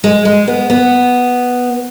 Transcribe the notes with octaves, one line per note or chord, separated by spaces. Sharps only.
G#3
G#3
B3
B3